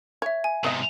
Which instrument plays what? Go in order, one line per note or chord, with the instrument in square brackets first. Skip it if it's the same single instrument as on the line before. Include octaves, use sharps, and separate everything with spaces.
[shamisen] C#5 [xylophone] E5 G#6
[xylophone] G#5
[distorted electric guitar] G#2 C3 [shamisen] B3 D#5